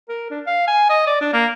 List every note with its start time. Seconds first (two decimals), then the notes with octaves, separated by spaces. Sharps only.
0.09 A#4
0.31 D4
0.47 F5
0.68 G#5
0.90 D#5
1.07 D5
1.21 D4
1.33 A#3